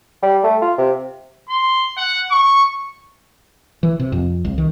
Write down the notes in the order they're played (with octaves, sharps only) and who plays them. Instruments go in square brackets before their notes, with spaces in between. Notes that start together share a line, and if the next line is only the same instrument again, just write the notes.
[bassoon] G3
A3
F4
C3
[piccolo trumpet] C6
F#5
C#6
[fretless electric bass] E3
C3
F2
C2
D#3